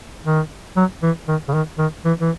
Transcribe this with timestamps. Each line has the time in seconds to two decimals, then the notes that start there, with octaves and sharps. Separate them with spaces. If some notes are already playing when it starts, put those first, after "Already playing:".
0.25 D#3
0.77 F#3
1.03 E3
1.28 D#3
1.48 C#3
1.54 D#3
1.79 D#3
2.05 E3
2.21 E3